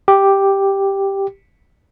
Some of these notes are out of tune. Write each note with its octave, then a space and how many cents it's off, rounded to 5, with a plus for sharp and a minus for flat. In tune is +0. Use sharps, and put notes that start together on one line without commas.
G4 +0